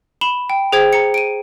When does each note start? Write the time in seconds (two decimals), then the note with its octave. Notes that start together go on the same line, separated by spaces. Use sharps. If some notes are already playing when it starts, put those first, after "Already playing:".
0.21 B5 E7 G7
0.50 G5
0.72 G#4 C5 G5 G#6
0.93 A#5 C#7
1.14 D7 D#7